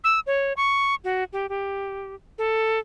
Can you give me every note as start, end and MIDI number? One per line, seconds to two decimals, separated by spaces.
0.04 0.20 88
0.27 0.53 73
0.57 0.95 85
1.04 1.24 66
1.33 1.49 67
1.49 2.15 67
2.38 2.79 69